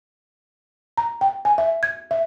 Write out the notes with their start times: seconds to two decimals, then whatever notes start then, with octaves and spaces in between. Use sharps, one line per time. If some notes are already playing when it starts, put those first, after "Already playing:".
0.98 A#5
1.21 G5
1.45 G#5
1.58 E5
1.83 G#6
2.11 E5